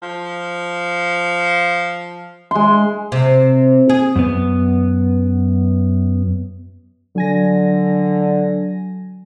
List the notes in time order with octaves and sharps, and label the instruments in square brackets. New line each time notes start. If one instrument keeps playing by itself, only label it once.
[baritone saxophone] F3
[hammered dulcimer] G#3 C6
[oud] C3
G#4
[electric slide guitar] F#2 B3
[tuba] D3 [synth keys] F#3 G#5 A#6